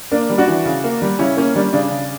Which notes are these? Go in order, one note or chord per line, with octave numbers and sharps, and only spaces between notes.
A#3 D4
G3
D4 F#4
E3
C#3
A#3
G3
C#3 C#4 E4
A#3 C#4
G3 D4
C#3 D4
C#3